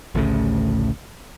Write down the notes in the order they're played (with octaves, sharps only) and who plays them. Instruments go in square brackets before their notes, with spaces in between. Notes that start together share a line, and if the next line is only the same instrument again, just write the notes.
[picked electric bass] A1 D2 A2 C#3